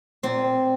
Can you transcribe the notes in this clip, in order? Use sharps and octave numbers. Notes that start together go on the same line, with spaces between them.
A#2 C4